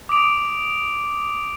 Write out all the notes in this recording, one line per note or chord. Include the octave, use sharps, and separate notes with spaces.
D6 D#6 D7 F7